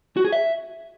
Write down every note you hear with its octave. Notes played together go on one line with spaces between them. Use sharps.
F#4
G#4
E5